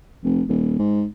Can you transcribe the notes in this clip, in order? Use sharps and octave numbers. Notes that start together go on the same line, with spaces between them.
F1
D#1
G#2